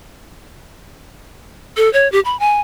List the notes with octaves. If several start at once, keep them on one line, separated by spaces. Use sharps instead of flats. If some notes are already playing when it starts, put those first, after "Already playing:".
A4
C#5
G4
B5
G#5